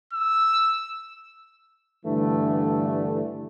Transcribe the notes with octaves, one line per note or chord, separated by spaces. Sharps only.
E6
G2 D3 E3 A3